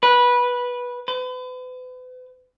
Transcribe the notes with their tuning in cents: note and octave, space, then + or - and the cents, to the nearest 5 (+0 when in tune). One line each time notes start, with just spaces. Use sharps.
B4 -15
B4 +40